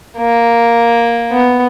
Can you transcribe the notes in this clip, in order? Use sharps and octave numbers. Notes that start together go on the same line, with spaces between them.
A#3
B3